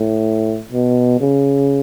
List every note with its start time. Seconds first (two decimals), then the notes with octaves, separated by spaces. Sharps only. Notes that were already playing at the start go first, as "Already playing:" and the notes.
Already playing: A2
0.72 B2
1.20 C#3